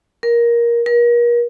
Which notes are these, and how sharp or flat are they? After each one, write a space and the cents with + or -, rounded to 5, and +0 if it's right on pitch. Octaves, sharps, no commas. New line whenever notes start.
A#4 +15
A#4 +40